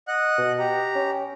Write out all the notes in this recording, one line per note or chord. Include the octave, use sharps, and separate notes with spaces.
D#5 F#5 F#6
B2
G4 A#5
C#4